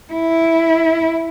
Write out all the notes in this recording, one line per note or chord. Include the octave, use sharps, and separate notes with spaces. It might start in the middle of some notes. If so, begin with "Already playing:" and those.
E4